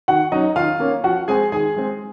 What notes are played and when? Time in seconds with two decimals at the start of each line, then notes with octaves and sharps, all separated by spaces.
0.08 D#3 F#4 F#5
0.32 F#3 C#4 D#4 D#5
0.56 D#3 F4 F5
0.80 A#3 C#4
1.04 F3 F#4 F#5
1.28 G#3 C4 G#4 G#5
1.52 D#3 G#4 G#5
1.76 G#3 C4